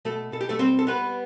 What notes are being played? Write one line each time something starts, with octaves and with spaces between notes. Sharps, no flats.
B2 A3 A4
B2 A4
G4
A3 A4
G3 C4 C5
A4
G3 B3 B4